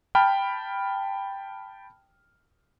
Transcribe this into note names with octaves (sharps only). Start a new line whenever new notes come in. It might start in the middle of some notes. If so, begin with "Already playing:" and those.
G5 A5 B5 F6